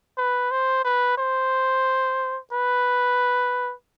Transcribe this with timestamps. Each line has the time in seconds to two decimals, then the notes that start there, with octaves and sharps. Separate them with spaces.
0.18 B4
0.51 C5
0.85 B4
1.18 C5
2.53 B4